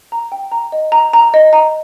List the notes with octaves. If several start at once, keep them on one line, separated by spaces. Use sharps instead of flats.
A#5
G5
A#5
D#5
A#5
A#5
D#5
A#5